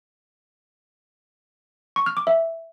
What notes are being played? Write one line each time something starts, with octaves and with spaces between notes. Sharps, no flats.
C#6
F6
D6
E5